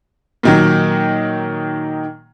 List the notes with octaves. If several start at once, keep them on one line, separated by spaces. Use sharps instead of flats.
A#2 D#3 F#3